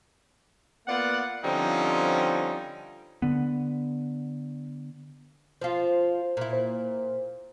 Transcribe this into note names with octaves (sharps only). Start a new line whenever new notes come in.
A#3 B3 F4 D5 F#5
D3 F3 G3 C4 C#4 D#4
D3 B3
F3 F4 C5
A#2 E4
C5